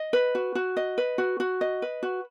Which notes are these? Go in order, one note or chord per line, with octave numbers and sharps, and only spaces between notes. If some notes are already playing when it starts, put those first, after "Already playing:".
Already playing: D#5
B4
F#4
F#4
D#5
B4
F#4
F#4
D#5
B4
F#4